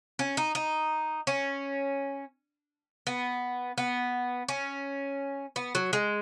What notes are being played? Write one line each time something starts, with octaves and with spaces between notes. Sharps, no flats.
C#4
D#4
D#4
C#4
B3
B3
C#4
B3
F#3
G#3